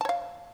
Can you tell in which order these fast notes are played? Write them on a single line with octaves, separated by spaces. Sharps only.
A5 C#5 F5